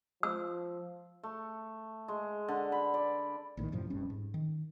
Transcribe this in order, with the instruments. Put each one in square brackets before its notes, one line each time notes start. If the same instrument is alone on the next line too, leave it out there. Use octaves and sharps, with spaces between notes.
[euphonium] F3 [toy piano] E6
[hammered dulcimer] A3
G#3
D3
B5
D5
[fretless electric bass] A#1 A2 C3 D#3
F#2 A2 C3 F3
F1 G2 C#4
G#2
D#3